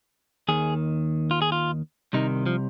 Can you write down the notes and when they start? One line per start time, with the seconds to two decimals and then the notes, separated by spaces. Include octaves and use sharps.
0.48 D#2 D#3 G#4
1.31 F4
1.42 G#4
1.52 F4
2.13 C2 C3 D#3 D#4
2.46 F3